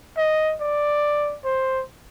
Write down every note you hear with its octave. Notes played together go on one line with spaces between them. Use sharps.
D#5
D5
C5